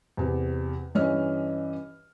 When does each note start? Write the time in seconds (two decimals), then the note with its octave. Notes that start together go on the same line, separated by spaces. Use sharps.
0.17 E2 C3
0.95 G2 E3 C#4 D#5 F6